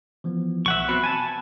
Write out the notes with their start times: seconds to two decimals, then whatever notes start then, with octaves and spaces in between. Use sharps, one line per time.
0.24 E3 F3 B3
0.66 B1 E5 F#5 C#6
0.89 B3 C4 F#4 B5 F#6
1.04 G#5 A5 B5